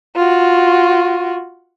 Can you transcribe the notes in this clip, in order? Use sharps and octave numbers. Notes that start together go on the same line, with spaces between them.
F4 F#4